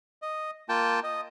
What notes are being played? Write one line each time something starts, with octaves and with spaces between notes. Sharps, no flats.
D#5
A#3 F4 G5 A5
D#5